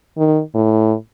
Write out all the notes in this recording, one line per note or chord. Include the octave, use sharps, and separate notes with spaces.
D#3
A2